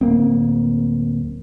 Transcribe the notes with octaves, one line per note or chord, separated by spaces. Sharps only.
D1 G1 A#3 C4